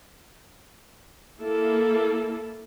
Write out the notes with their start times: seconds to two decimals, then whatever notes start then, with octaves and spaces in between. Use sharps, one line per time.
1.41 A#3 E4 A4